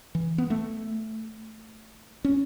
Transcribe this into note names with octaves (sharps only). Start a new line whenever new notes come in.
E3
B3
A3
C#4